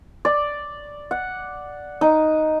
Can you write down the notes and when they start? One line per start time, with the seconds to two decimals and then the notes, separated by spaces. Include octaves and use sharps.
0.25 D5
1.11 F#5
2.01 D#4